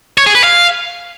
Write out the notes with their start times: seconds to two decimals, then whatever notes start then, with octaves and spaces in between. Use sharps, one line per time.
0.18 C#5
0.26 G#4
0.35 B4
0.44 F5